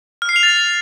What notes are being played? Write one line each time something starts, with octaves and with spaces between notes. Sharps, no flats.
F6
C7
F7
A6